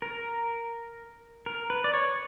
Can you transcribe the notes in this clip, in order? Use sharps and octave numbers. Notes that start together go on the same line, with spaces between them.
A#4
A#4
B4
D5
C#5